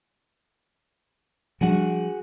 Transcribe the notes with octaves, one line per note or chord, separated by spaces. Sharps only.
F3 G3 D4 F#4 G#4 F#5